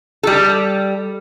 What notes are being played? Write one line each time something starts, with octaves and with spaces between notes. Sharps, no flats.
G3 A4